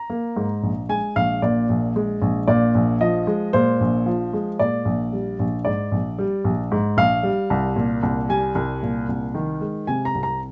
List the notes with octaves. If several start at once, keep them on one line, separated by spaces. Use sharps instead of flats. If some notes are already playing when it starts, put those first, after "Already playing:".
Already playing: A#5
A#3
G#2
A#1
G#3 G#5
A#1 F5
A#2 D5
A#1
G#3
A#1
A#2 D5
A#1
F3 D#5
G#3
A#2 C5
A#1
F3
G#3
A#2 D5
A#1
G3
A#1
G#2 D5
A#1
G3
A#1
G#2
A#1 F5
G3
C2
A#2
C2
G3 G#5
C2
A#2
C2
D#3
G#3
C3 G#5
A#5
C2
A#5